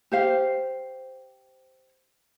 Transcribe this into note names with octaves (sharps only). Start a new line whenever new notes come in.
G4 C5 F5